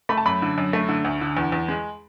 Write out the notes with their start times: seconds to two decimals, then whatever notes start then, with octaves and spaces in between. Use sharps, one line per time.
0.09 A3 B5
0.17 A5
0.26 F#2 B5
0.42 D3
0.58 F#2
0.73 A3
0.89 D3
1.05 D2
1.21 D3
1.37 E2
1.52 E2
1.68 G#3